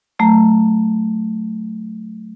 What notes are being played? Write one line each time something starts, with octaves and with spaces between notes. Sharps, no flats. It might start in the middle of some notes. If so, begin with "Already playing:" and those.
F#3 A3 A#5